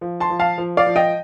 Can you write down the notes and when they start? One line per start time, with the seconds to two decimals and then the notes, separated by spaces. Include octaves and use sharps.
0.01 F3
0.20 A5 C6
0.30 F3
0.39 F5 A5
0.58 F3
0.77 D5 F5
0.86 F3
0.96 D#5 G5